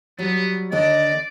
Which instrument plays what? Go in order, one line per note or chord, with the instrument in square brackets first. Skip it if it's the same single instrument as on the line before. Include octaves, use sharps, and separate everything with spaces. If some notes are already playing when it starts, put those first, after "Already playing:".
[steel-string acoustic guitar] F#3 G3 [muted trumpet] B3
[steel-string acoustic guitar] D#2 D3 D4 [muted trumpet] D5 [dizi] D#5